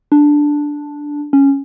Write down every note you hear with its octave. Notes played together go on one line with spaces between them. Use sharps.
D4
C#4